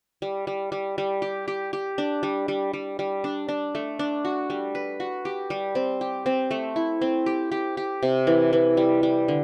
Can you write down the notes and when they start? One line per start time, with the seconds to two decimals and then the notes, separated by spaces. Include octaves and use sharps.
0.22 G3
0.47 G3
0.72 G3
0.98 G3
1.22 G4
1.48 G4
1.73 G4
1.98 D4
2.23 G3
2.48 G3
2.73 G3
2.99 G3
3.24 D4
3.49 D4
3.75 A3
3.99 D4
4.25 F#4
4.50 G3
4.75 B4
5.00 F#4
5.25 G4
5.50 G3
5.75 C4
6.01 G4
6.26 C4
6.51 A3
6.76 E4
7.01 C4
7.26 G4
7.52 G4
7.77 G4
8.03 C3
8.27 E3
8.53 E3
8.77 G3
9.03 G3
9.28 D3